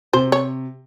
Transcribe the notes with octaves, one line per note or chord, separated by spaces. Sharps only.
C3 C5
C#5